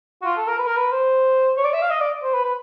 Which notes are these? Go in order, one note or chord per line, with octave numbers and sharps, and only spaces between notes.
F#4
F4
A4
A#4
B4
A#4
B4
C5
C#5
D5
E5
F5
D#5
D5
C5
B4
B4